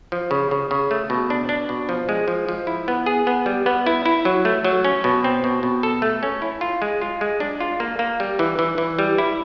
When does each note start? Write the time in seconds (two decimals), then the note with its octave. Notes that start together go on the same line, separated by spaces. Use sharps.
0.12 F3
0.31 C#3
0.51 C#3
0.71 C#3
0.91 A3
1.10 B2
1.30 D4
1.49 D4
1.69 B2
1.89 F3
2.09 G#3
2.28 F3
2.49 F3
2.67 E4
2.88 B3
3.06 G#4
3.27 B3
3.46 G3
3.66 B3
3.86 E4
4.06 E4
4.25 F#3
4.45 A3
4.64 F#3
4.85 C#4
5.04 B2
5.24 C4
5.44 B2
5.63 B2
5.83 A4
6.02 A3
6.23 C#4
6.42 E4
6.61 F4
6.82 G#3
7.01 F4
7.21 G#3
7.40 D4
7.60 F4
7.80 A#3
7.99 A#3
8.20 G3
8.39 E3
8.59 E3
8.78 E3
8.99 G3
9.18 E4